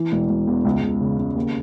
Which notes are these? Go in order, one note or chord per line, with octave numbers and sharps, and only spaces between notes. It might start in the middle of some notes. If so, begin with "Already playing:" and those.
Already playing: E3
E1
E1
E2
C#2
C#2
C#3
C#3
D#2